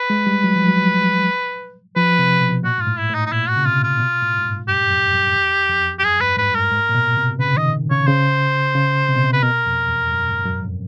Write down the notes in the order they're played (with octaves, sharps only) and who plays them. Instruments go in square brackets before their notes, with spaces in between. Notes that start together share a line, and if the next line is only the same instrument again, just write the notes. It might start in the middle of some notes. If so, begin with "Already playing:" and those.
Already playing: [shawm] B4
[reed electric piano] G#3
G3
F#3
F3
F#3
[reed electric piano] F3 [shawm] B4
[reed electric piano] C3
B2
[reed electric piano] A#2 [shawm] F#4
[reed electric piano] G#2 [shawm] F4
[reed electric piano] A2
[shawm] E4
[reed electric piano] A2
[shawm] D#4
D#4
[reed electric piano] A#2 [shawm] E4
[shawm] F#4
[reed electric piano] C#3
[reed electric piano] C3 [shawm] F4
[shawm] F4
[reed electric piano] B2
A2
G#2
G2
[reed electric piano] F#2 [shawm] G4
[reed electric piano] F2
F#2
E2
F2
[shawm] G4
[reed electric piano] F#2 [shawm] G#4
[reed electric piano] G2 [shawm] B4
[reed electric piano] G#2 [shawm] B4
[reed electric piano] G2 [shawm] A#4
[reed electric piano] G#2
A#2
B2
C3
[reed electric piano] C#3 [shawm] B4
[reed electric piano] D#3 [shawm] D#5
[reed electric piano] C#3 [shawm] C#5
[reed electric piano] C#3 [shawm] C5
[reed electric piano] C#3
C3
B2
C3
[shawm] B4
[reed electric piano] B2 [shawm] A#4
[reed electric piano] F2
E2
F#2
G#2
F#2
F2